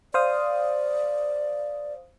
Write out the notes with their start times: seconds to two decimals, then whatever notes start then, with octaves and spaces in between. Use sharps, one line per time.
0.14 C5 D5 F5 D#6